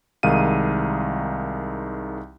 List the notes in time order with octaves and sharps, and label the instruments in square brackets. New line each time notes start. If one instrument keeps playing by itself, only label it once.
[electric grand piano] C2 D#3 G#3 D#4 F5 D#7